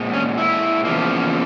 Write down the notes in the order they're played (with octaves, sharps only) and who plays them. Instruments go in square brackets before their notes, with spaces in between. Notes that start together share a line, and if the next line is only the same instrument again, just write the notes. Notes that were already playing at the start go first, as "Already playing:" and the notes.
Already playing: [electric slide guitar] A#2 G#3 C4
C#4
E4
E2 C#3 F3 A#3